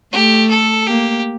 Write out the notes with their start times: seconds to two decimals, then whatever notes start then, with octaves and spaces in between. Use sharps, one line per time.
0.13 A3 G4
0.50 A4
0.87 A#3 G4